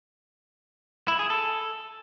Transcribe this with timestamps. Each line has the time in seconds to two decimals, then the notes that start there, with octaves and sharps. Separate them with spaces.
1.08 E4
1.19 G#4
1.30 A4